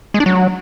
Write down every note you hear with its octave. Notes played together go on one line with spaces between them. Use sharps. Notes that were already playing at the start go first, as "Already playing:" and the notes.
G#3
D4
F#3